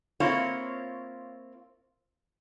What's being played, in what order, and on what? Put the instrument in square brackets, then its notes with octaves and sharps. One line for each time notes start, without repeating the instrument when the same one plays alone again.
[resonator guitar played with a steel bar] A#3 C4 E4 F4 C#5